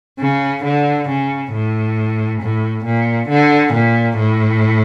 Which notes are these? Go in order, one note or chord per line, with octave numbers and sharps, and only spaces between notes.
C#3
D3
C#3
A2
A2
A#2
D3
A#2
A2